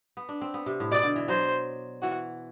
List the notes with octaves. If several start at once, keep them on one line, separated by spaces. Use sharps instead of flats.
B3
D4
C4
B3
C3
A2
B2 D5
D3
E3
F#3 C5
E3 F#4